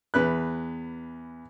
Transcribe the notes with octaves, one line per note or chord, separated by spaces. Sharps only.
E2 B4 F#6